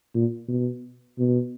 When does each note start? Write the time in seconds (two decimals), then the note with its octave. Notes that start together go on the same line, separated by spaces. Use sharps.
0.14 A#2
0.48 B2
1.19 B2